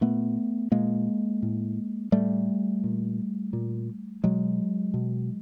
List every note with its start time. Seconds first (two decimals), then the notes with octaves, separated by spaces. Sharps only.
0.01 A#2 A3 B3
0.72 A#2 G#3 A#3
1.42 A2
2.12 A2 G3 A3
2.84 A#2
3.53 A#2
4.24 B2 F#3 G#3
4.94 B2